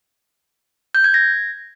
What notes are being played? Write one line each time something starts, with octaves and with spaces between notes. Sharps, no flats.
G6
G#6
A#6